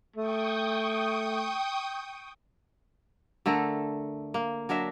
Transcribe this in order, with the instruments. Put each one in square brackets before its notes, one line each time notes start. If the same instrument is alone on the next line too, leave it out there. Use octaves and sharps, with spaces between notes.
[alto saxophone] A3 [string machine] G5 C#6 D#6
[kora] D3 A3 A4 A#4
A#3
F#3 D4 A#4 E5